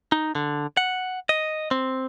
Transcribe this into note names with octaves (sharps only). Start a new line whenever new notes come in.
D#4
D3
F#5
D#5
C4